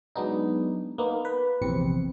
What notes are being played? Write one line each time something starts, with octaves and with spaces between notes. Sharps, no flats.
F#3 G#3 B3 D4 D#4
A#3 B3 D#4
B4
A#1 E2 C3 C4 C#7